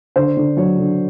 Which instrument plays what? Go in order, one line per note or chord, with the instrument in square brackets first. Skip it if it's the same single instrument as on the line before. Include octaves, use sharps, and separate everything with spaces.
[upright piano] D3 C5
D3
F#3 C#5
D3